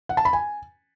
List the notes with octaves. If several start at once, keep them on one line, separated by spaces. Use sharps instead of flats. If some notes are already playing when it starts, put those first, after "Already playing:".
F#5
A5
B5
G#5